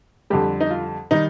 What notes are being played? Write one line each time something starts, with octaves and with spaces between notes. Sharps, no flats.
F2 D3 G3 G4
D#4
F4
D#3 G3 D#4